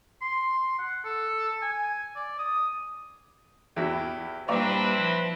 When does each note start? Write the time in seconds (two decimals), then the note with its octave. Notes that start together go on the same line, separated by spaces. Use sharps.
0.22 C6
0.78 F#5
1.04 A4
1.62 G#5
2.16 D5
2.39 D#6
3.76 E2 E4 F#4 G4
4.48 A#2 G3 C4 D4 E4 B4 D5 A#5
4.99 F3